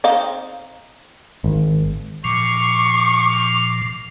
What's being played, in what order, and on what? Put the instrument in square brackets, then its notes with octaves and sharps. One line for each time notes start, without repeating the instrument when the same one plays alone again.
[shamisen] C4 D#4 F5
[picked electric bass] G#1
[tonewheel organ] A#2 F3 [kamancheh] C#6 [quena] D6